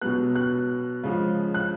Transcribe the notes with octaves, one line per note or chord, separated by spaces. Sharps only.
B2 F#3 B3 F#6
F#6
C#3 F3 G#3
F#6